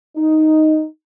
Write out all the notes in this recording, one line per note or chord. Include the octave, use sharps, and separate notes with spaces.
D#4